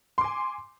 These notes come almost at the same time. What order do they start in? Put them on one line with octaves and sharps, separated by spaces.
C6 D6 G#5